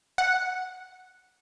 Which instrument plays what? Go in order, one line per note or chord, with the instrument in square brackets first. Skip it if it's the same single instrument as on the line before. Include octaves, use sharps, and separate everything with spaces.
[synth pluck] F#5